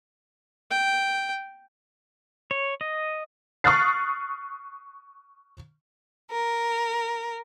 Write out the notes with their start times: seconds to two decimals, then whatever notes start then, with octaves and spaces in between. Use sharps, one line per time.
0.71 G5
2.51 C#5
2.81 D#5
3.64 C#6 D#6 F6 F#6 A6 C7
6.32 A#4